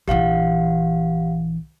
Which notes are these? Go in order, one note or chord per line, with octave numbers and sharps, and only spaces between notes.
A#1 E3 G4 F5 F#5